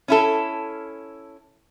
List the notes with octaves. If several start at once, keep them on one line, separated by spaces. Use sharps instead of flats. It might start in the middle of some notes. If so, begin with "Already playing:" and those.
C#4 E4 A4